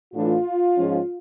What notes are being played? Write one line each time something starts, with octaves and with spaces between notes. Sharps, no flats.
A2 E3 A3 D4 F4
G#2 F3 G#3 C#4